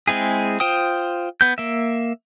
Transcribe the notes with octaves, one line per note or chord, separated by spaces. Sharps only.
G#3 C4 E4 G#4
F4 C5 G5 D#6
B3 G6
A#3 E5